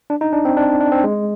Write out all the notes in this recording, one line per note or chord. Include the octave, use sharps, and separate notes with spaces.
D4
D#4
D4
C4
D4
D4
C4
G#3